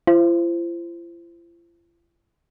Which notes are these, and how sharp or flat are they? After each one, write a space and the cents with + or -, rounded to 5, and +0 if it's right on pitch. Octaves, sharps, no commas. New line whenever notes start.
F4 -45 C5 +0